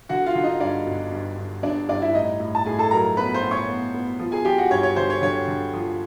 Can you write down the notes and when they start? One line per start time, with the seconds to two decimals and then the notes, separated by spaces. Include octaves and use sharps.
0.09 D3 F#4 F#5
0.26 F4 F5
0.35 D3
0.43 D#4 D#5
0.60 G2 D4 D5
0.87 G1
1.12 G2
1.37 G2
1.63 G1 D4 D5
1.88 G2 D4 D5
2.02 E4 E5
2.14 A2 D#4 D#5
2.40 A2
2.55 A5
2.65 A2 G#4 G#5
2.79 A4 A5
2.91 F#3 A#4 A#5
3.17 B3 B4 B5
3.34 C5 C6
3.43 A2
3.51 C#5 C#6
3.69 B3
3.94 B3
4.19 F3
4.32 G#4 G#5
4.45 F3 G4 G5
4.58 F#4 F#5
4.71 G2 C#5
4.83 C#5
4.96 D3 C5
5.10 C#5
5.22 D3 C#5
5.48 D3
5.74 F3